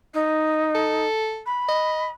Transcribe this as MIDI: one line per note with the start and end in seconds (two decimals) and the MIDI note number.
0.13 1.05 63
0.75 1.42 69
1.46 2.11 83
1.68 2.07 75